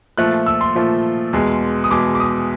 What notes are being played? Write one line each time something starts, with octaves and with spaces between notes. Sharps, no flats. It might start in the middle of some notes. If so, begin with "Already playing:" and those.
A#2 F3 A3 F#6
E6
C6
A#2 F3 A3
E2 B2 G#3
D#6
E2 B2 G#3 D6
D6
D#6